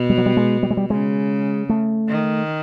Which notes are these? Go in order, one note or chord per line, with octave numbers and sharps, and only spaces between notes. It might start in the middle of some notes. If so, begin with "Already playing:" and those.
Already playing: B2
G3
F#3
G3
G#3
G3
G#3
G3
C#3 G#3
A3
D#3